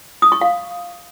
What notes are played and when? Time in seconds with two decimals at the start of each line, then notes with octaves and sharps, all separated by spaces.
0.22 D#6
0.32 C#6
0.41 F5